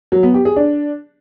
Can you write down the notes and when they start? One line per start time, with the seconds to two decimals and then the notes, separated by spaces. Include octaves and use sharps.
0.12 F#3
0.23 B3
0.34 G4
0.45 G#4
0.56 D4